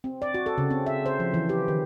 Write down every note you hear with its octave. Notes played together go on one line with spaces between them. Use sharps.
C4
D5
F#4
A4
C#3
C4
E5
C5
F3
E3
G4
D#3